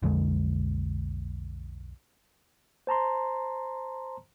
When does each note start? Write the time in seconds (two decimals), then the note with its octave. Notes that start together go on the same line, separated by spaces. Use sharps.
0.02 B1 F2 D3 G#3
2.87 C5 A5 A#5 C6